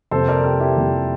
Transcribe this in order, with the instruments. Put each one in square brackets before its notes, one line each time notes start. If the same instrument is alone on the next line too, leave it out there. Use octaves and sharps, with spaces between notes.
[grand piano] F2 C3 G3 A#3 A4 C5
A#4 D5
G4 A#4
E4 G4
F2 C3 G3 A#3